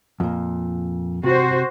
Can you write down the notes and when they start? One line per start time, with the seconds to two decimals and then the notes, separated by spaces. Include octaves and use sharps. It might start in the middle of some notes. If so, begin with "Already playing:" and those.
0.20 F2 A#2
1.24 C3 F#4 C5